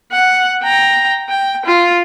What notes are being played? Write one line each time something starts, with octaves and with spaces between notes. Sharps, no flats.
F#5
G5 A#5
G5
F4